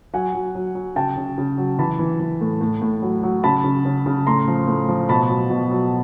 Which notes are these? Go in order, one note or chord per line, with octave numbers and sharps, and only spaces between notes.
F#3 F#5 G#5
F#3
F#3
F#3
C#3 G5 A5
C#3
C#3
F#3
E3 A5 B5
E3
E3
A2
A2
A2
F#3
F#3
C#3 A5 B5
C#3
C#3
C#3
A2 A#5 C6
F3
A2
F3
B2 A5 B5
F#3
B2
F#3